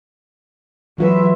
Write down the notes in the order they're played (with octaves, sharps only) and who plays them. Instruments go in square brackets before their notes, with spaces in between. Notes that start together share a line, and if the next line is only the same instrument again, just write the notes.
[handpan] E3 F4 B4 [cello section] F#3 G#3 E5